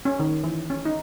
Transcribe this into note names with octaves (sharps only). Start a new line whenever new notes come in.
C#4
D#3
E3
C#4
D#4